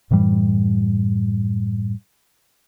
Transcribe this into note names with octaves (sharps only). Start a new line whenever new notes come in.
F#2 A2 E3 G3